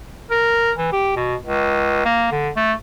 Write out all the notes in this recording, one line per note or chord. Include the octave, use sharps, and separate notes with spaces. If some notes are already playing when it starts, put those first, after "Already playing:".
A#4
E3
G4
B2
C#2
A#3
D3
A3